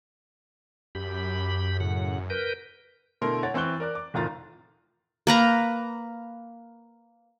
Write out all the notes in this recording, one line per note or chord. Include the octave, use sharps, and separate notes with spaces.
F#2 G4 B5
A2 C#3 F#5
A#4 B4 G6
B2 D3 A3 E4 A#4 C6
C#5 F#5 A6
E3 C4 C#6 F#6 G7
A#4 D5 F#6
D6
F1 A2 D#3 F4 A#5 A6
A#3 B4 A#5